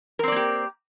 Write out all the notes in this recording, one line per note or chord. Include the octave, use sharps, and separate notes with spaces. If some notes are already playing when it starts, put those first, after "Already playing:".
A#3 C4 G4 A#4 D5